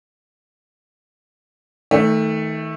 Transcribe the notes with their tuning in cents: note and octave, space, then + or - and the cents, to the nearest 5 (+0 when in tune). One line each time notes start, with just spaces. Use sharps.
D#3 +35 A3 +0